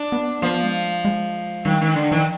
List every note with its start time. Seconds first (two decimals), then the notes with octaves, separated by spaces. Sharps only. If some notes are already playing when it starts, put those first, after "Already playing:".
Already playing: D4
0.12 B3
0.42 F3 B3
0.63 G#3
1.05 G#3
1.65 D#3 G3
1.81 D#3 G#3
1.96 D3
2.12 D#3 F3